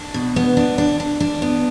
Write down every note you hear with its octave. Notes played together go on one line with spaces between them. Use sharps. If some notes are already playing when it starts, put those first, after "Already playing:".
Already playing: D4
B2
B3
D4
D4
D4
D4
B3